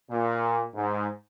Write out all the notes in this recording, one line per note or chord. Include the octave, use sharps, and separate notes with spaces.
A#2
G#2